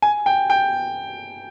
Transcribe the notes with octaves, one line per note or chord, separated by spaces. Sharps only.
G#5
G5
G5